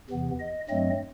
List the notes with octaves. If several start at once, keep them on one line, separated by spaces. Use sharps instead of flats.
E2 C3 E3 B3
D#5
G2 F#3 A3 C4 D#5